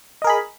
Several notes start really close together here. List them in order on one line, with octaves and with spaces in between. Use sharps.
D#5 A#4 G#4 B5